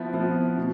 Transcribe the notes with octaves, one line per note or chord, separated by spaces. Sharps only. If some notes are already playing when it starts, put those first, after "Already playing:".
Already playing: F3 B3 E4
F3 B3 E4
B2